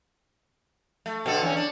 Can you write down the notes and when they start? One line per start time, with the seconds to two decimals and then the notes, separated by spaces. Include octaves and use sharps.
1.06 A3
1.26 B2 D3 A4
1.43 E2 C#4
1.57 D4